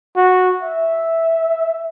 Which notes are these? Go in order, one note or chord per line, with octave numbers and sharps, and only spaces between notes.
F#4
E5